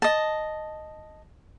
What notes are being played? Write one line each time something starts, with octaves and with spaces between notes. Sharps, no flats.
D#5 A5